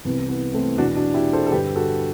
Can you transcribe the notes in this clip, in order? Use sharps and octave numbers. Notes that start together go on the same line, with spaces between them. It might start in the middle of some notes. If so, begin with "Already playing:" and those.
C2 C3 E3 B3
B3
A3 C4
E2 B2 D4 F#4
D4 F#4
E4 G4
A4 C5
A4
G2 D3 G4 B4
F#4 A4